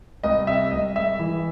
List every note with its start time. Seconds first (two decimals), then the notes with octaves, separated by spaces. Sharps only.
0.23 C2 D#5
0.47 C3 E5
0.71 C2 D#5
0.95 G#3 E5
1.19 E3